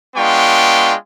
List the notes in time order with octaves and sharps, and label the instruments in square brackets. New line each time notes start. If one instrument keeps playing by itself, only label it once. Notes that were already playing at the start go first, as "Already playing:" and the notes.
[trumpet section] G#3 B3 D4 F4 G5 C#6